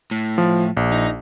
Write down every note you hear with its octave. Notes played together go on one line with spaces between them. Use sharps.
A2
F3
A#1
D#4